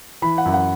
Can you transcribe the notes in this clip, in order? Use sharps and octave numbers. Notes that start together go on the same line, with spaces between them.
E3 B5
F#5
F#2
F#5